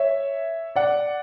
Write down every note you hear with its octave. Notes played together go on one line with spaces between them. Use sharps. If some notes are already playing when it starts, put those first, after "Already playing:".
Already playing: C#5 E5
D5 F#5